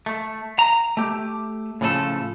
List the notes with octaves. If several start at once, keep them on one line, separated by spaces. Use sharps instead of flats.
A3
A#5
A3 G4
A2 C#3 F3 A3 G#4 A4